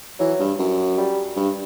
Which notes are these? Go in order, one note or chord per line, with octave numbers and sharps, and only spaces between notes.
E3 F#3
G2
F#2
G3
G2